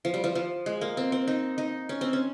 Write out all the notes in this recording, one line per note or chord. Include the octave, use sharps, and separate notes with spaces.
F3
G3
F3
F3
G#3
A#3
C4
C4
D#4
D#4
C#4
C4
C#4